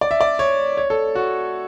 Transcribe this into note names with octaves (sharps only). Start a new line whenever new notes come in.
D5
E5
D5
C#5
C#5
A4
F#4